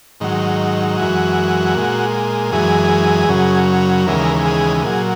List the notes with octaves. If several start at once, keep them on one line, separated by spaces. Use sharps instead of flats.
G#2 D#3 F#3
F#2 E3 G#3 F#4
A#2 G#3
F#2 E3 G#3 G#4
F#2 C#3 F#3
D#2 C#3 E3 G#3 A#4
G#4
A#2 F#3 G#4